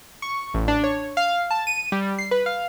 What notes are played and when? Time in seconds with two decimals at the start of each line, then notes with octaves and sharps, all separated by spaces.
0.22 C#6
0.54 A1
0.68 D4
0.84 C#5
1.17 F5
1.51 A5
1.67 D#7
1.92 G3
2.19 C7
2.31 B4
2.46 F5